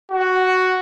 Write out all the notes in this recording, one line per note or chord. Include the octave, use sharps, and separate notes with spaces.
F#4